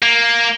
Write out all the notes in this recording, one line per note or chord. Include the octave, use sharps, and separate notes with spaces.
A#3